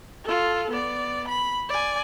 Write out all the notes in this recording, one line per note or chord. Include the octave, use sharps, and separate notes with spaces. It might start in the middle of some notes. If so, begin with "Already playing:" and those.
F4 A4
B3 D5
B5
D5 G#5